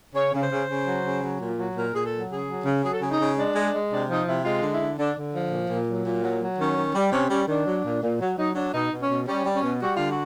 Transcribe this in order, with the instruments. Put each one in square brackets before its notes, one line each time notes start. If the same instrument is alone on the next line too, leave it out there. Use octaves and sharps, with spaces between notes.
[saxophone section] C#3 C#5
C#3
C5
C#3
C#3
F#3
C#3
F#3
A#2
F#3
A#2 A#4
A#2 G#4
A4
F#3
C#3 G#4
F#3
C#3
F#3 G#4
A4
C#3 G#4
D#4
C#3
G#3 D4
G#3
G#3
C3 D4
F3 D#4
C3 E4
G#3 F4
D3
E4
D3
D3 D4
D3
F3
A#2
A#2
F#3
A#2
F#3
F#3
D#3 C#4
D#3
G3
C3 C#4
G3 C#4
D#3 D4
F#3
A#2
A#2
F#3
F#3 D#4
F#3 D4
B2 D#4
B2
C#4
B2
G3 C#4
G3
C#4
B2
G3 F#4
D3 F4
F#4